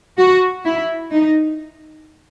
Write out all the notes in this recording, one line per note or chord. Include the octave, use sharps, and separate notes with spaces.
F#4
E4
D#4